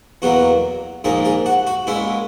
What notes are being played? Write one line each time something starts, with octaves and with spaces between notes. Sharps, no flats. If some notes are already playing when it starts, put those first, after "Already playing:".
E2 B2 F#3 A#3 F#4
A#1 G#2 D#3 A#3 G#4
G#4
F#4
F#4
A#2 G#3 C#4 E4